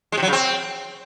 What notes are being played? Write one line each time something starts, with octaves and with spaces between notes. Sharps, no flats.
G#3
C3
F#3
C#3
C4